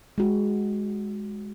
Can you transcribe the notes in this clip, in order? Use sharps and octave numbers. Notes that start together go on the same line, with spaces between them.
G#3 F#4